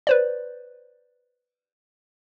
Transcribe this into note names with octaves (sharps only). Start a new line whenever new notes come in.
B4 C5 D5